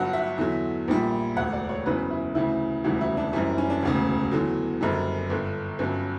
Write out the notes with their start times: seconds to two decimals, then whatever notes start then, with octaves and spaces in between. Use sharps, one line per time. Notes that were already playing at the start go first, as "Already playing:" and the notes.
Already playing: G1 G2 F#3 F#5
0.13 E5
0.38 E2 D3 F#3
0.88 A#1 A#2 G3
1.36 E1 D2 D3 F#5
1.53 D5
1.69 C#5
1.86 F#1 E2 C#3 F#3 B4
2.10 E4
2.34 D2 C#3 E3 E4
2.84 E1 D2 C#3 E3 G3 F#4
3.01 E4
3.17 D4
3.33 F#1 F#2 E3 G3 C#4
3.58 C#4
3.70 D4
3.83 E1 D2 C#3
4.32 E2 D3 F#3
4.81 F#1 F#2 D3 G3
5.30 G1 G2 D3
5.79 G1 G2 F#3 C#4